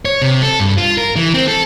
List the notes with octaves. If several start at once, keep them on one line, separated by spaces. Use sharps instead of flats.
C#5
C3
A4
G2
F4
A#4
E3
C4
A4